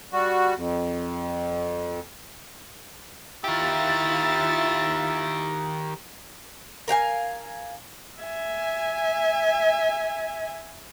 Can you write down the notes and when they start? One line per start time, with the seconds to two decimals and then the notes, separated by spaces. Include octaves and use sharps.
0.13 G3 F#4
0.56 F2
3.44 D#3 E4 F4 G4 E5 A6
6.88 A#4 F5 G5 G#5
8.20 E5 G#5